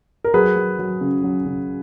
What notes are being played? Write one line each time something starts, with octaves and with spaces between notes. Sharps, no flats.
A#4
F#3 G#4 B4
F#3
F#3
C#3
F#3
C#3